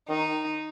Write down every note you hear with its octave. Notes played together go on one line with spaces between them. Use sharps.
D#3 D#4